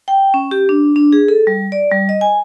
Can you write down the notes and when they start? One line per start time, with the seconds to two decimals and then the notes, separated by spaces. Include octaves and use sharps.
0.08 G5
0.34 C#4
0.51 G4
0.69 D4
0.96 D4
1.13 G#4
1.28 A4
1.47 G3
1.72 D5
1.91 G3
2.09 D#5
2.21 G#5